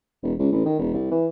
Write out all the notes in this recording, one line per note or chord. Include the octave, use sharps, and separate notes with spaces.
E1
C#2
A1
D#3
E1
C2
E3